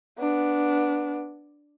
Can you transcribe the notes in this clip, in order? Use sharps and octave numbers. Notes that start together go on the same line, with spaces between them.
B3 D4